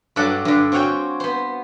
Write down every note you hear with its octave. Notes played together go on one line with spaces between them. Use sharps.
G2 F#3 A4 D5 F#5
G2 D3
C4 F4 F#4 C#5 G5 G#5
B3 C5